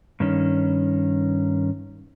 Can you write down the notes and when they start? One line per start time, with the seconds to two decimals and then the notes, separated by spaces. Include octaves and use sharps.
0.20 G2 D#3 C#4